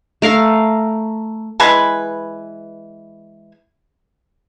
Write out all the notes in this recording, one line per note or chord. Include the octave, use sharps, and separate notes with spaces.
A3 A#4 F5
E3 G#3 B4 G#5